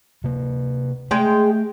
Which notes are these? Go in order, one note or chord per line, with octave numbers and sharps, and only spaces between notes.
C3 A#3
G#3 A3 G5